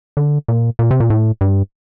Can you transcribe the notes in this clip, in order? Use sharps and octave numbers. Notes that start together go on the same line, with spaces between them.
D3
A#2
A#2
C3
A#2
A2
G2